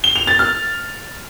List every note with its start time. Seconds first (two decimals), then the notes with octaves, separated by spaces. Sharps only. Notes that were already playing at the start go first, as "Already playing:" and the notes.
0.04 G7
0.16 F7
0.27 A6
0.39 F6